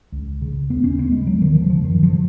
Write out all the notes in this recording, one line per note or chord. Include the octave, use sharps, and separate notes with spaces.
C#2
C#3
D#2 B3
C#4
C#3 B3
G#3
D#2 F#3
D#3
C#3 F3
F3
F#2 D#3
F3
C#3